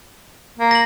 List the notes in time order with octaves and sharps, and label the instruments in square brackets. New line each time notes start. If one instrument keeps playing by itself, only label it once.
[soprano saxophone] A#3
[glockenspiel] A#6 F#7